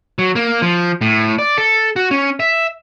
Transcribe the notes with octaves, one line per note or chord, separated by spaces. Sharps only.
F#3
A#3
F3
A2
D5
A4
F#4
C#4
E5